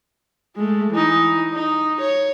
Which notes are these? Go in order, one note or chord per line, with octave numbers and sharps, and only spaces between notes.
G#3 A3
E3 D#4
D#4
C#5